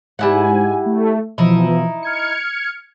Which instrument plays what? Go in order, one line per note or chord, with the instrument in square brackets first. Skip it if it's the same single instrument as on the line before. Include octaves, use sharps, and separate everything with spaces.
[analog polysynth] G#2 G#5 [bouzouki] G3 E4 F#5
[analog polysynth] A3
[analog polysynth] B2 E3 F3 [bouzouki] D#4 E4
[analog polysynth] F6 G#6 C#7